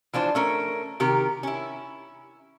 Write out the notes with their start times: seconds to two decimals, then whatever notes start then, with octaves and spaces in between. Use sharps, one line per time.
0.14 E3 F3 D4 C5
0.35 A3 C#4 A#4
1.00 C3 D#3 G4 A#4
1.43 C#4 E4